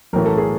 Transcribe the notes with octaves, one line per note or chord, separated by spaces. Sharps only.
B1 A2 E3 A3 A#4
A4
G#4